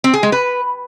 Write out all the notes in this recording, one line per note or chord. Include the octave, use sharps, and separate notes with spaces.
C4
G#4
G#3
B4